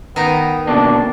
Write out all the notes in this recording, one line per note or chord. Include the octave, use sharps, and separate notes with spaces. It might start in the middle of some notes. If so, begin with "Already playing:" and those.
D#3 B3 D#4
D2 B2 A#3 D4